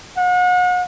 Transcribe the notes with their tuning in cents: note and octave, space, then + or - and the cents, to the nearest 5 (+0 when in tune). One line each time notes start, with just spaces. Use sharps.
F#5 -40